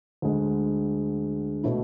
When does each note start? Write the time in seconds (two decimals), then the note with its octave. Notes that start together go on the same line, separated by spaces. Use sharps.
0.22 D2 D3 G#3
1.64 B2 A3 E4